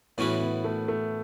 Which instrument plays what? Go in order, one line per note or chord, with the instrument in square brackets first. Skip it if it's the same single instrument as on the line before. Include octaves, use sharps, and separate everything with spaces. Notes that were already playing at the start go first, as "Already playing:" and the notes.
[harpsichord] A2 E3 C#4 F#4 B4 [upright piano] B3
[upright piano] B3
A3
A3